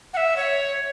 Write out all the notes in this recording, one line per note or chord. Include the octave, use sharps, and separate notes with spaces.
F#5
E5
C#5